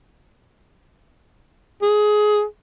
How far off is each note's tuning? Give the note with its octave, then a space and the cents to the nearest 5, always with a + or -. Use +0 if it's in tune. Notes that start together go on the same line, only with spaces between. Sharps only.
G#4 +20